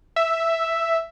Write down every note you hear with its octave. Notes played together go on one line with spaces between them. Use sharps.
E5